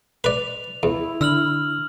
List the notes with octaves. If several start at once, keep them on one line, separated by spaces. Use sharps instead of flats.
B4 D5 F7
E2 E4
D3 E6 F6 F#7